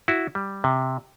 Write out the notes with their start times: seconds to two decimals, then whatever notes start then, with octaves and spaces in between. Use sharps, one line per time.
0.08 E4 F#4
0.35 G3
0.64 C3